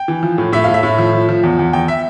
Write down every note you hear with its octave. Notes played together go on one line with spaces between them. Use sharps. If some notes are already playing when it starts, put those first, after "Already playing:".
Already playing: G5
E3
F3
A2
A2 E5
A2 F5
E5
A2
F3
F3
F3
E2
E2
E2 G5
E5